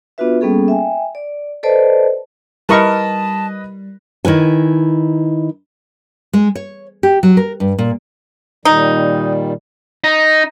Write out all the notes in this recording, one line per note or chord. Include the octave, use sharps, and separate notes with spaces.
B3 D4 F4 F#4 B4 E5
G3 A#3 B3 C#4 G#4 A4
E5 G5 G#5
D5
A4 B4 C5 D5 D#5 A5
G3 E4 A#4 B4 D#5 A5 C#6
D#3 E4 B4 G#5
G#3
C#5
G4
F#3
A#4
G2
A#2
A#2 D#3 G3 D#4
D#4